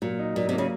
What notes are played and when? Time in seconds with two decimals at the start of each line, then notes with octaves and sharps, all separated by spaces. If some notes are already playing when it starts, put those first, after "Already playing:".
0.02 A#2 F#3
0.19 D#4
0.36 A#2 F#3
0.49 C3
0.53 A#3
0.58 C#3